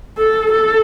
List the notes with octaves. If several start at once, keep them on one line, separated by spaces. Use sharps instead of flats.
A4
A4